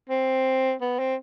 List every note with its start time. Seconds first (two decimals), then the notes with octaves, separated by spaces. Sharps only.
0.10 C4
0.81 B3
0.99 C4